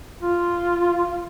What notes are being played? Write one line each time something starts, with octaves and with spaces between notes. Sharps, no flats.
F4